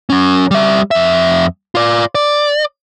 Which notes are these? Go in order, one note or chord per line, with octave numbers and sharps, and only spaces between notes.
F#3 C#4
G3 E5
F2 E5
F4 D5
D5